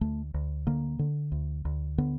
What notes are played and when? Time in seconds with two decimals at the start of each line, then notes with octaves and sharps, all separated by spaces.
0.01 D2 A3
0.34 D2
0.67 D3 A#3
0.99 D3
1.32 D2
1.65 D2
1.98 D3 B3